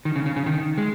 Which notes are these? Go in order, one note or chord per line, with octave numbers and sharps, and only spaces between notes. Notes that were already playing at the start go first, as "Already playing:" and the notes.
D#3
C#3
C#3
C#3
D#3
G#3